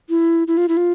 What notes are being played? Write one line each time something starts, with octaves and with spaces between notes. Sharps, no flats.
E4
E4
F4
E4
F4